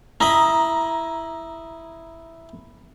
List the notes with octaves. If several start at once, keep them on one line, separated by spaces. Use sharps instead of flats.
E4 D#5 A#5 B5